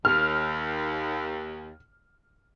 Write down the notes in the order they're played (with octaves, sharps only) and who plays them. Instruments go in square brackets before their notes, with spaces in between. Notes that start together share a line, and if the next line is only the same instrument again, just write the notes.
[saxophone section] D#2 [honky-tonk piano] F6